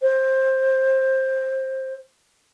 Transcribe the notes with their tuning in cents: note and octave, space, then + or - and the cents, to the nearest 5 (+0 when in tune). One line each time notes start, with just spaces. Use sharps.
C5 +15